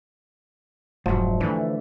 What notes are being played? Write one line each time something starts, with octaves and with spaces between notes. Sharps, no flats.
F1 G#2 F3 F#3
D3 E3 A3